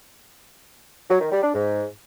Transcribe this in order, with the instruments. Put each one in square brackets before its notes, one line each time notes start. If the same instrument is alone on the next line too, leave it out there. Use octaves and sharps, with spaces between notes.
[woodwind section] F#3
D#3
G3
D4
G#2